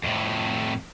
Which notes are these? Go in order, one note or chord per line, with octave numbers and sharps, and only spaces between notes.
F2 A2